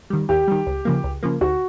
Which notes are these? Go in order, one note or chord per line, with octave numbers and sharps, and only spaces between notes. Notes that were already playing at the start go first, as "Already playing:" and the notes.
D#3 G3
D#2 G4
D#3 G3
C#2
C#3 F3 A#3
C#2
C#3 F3 A#3
D2 F#4